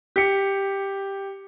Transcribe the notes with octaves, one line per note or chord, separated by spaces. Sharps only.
G4 C#7